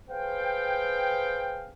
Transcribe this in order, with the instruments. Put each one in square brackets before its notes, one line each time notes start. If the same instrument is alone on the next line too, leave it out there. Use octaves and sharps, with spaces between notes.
[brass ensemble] G#4 B4 C5 F5 G5